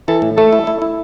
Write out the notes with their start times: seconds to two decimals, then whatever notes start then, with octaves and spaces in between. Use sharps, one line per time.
0.08 E3 A4
0.22 A2
0.37 A3 A4
0.53 E4
0.67 E4
0.82 E4